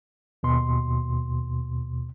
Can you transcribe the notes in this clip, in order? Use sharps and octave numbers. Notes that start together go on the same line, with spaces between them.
D#2 B2 C6